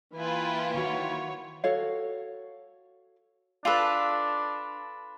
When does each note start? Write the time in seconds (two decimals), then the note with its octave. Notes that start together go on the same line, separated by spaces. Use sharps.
0.17 E3 A#3 E4 F4 B4 G5 G#5
0.74 D#3 F#4 C#5
1.64 F#4 A4 C#5 F5
3.65 D4 F4 A4 B4